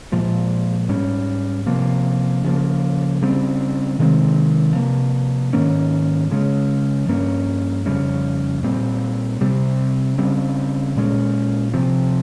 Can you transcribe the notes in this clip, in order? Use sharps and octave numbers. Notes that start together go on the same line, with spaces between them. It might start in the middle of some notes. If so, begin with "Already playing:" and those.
A#2 F3 G#3
G#2 G3 C#4
C3 F3 A#3
C#3 F3 A#3
C#3 G3 C4
C3 D#3 G#3 C4
C3 F3 A#3
G#2 D#3 A#3 C#4
C#3 G#3 C#4
G2 F3 A#3 C#4
F2 C#3 G3 C#4
A#2 G3 C4
C3 G3 C4
C#3 G3 C4
A#2 G#3 C#4
C3 F3 C4